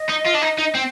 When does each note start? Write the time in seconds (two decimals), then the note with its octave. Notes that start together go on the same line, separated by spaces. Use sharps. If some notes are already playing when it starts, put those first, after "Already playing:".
Already playing: D#5
0.09 D#4
0.26 F4
0.35 D4
0.42 D#4
0.59 D#4
0.75 C4 G5